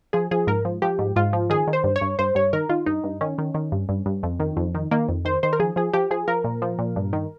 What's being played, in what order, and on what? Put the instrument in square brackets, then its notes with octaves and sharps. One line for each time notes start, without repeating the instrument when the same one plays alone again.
[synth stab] F3 G#4
F3 G#4
G#2 A#4
F3
F3 G4
G#2
G#2 F4
F3
D#3 G#4
D#3
C5
G2
C#5
G2
G2 C5
G2 C#5
D#3 A#4
D#3 F4
G2 D#4
G2
D#3 C#4
D#3
D#3
G2
G2
G2
F2
D#3
F2
D#3
D#3 A#3
F2
D#3 C5
D#3 C5
A#4
F3 G#4
F3 G#4
F3 G4
F3 G#4
F3 A#4
A#2
F3
A#2
G2
D#3